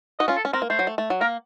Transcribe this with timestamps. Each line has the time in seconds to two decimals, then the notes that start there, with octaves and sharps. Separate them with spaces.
0.19 D#4 F#4 D#5
0.28 C#4 F4
0.37 A4
0.45 C#4
0.53 C4 A#4
0.62 A#3
0.70 A3 C5
0.79 F#3
0.87 A3
0.98 A3
1.10 F#3
1.21 A#3 A#4